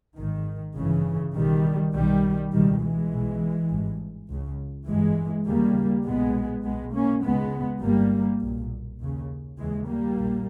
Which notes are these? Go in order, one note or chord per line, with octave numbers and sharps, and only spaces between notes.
G#1 G#2 D#3
G#1 G2 C#3 E3
B1 B2 D#3 G3
B1 B2 D#3 G3
C#2 B2 D#3 G3
E3 G#3
B1 B2
G#1 G2
C#2 C#3
G1 G2 E3 G#3
D#2 C#3 G3 A#3
B1 A#2 G#3 B3
B1 B2 G#3 B3
A#3 C#4
C#2 C#3 G#3 B3
G1 G2 G3 A#3
B1 A#2
D#2 C#3
D#2 C#3 E3 G#3
G3 A#3
A#1 A#2